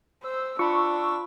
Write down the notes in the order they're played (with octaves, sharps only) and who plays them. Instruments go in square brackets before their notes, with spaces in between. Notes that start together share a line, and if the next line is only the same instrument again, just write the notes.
[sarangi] C5 [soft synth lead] E6
[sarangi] D4 [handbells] F4 B5 [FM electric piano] C#6